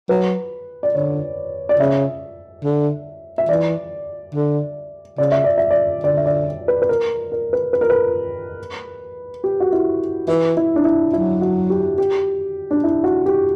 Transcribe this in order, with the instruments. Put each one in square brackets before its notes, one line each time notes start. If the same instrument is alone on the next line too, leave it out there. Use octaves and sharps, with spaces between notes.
[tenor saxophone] F#3 [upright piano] B4
[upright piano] D5
[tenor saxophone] D3 [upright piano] C#5
[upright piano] D5
[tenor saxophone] C#3 [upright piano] E5
[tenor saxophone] D3
[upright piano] E5
[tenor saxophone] E3 [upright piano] D5
[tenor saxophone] D3
[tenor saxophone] C#3 [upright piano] D5
[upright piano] E5
D5
E5
D5
[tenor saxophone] D3 [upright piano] D5
[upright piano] E5
D5
B4
B4
A#4
A#4
B4
B4
A#4
B4
G4
F#4
E4
[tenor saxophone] E3 [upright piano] E4
[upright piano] E4
D4
E4
[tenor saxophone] F#3 [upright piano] E4
[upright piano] F#4
G4
G4
D4
E4
F#4
G4